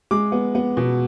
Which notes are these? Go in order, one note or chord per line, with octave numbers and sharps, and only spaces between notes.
G#3 D6
B3
B3
B2